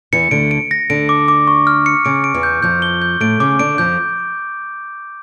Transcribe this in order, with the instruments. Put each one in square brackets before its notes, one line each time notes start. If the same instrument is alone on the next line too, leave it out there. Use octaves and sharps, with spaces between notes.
[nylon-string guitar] E2 E3 [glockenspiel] C#7
[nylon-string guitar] D2 D3 [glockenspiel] D7
[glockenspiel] D7
A#6
[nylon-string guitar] D2 D3 [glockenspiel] D7
[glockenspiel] D6
D6
C#6
F6
C#7
[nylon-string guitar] C#3 [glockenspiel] D7
[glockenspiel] D7
[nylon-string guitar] E2 E3
[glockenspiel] G6
[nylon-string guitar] F2 F3 [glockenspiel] G6
[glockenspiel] G7
G6
[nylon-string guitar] A2 A3 [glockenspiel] D7
[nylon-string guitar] C#3 C#4 [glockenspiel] D6
[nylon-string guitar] D3 D4 [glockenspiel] D7
[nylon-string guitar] F2 F3 [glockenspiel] G6